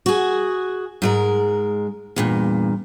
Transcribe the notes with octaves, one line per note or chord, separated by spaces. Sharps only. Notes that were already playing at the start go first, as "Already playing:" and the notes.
F#4 G#4
G#2 G#3 A#4
E2 G2 A#2